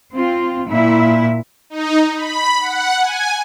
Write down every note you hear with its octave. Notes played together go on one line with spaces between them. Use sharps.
C4 F4
A#2 E4 E5
D#4
B5
F#5
G#5